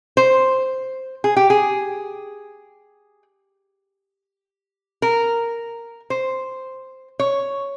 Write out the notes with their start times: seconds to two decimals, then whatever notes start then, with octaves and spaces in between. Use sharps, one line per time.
0.17 C5
1.24 G#4
1.37 G4
1.50 G#4
5.02 A#4
6.10 C5
7.19 C#5